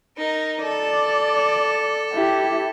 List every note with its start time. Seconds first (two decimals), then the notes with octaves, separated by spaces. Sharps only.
0.17 D#4 A#4
0.63 A4 D5
2.13 E4 G4